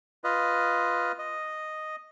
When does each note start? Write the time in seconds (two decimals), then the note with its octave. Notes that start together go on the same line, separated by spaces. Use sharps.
0.24 F4 B4 D#5
1.19 D#5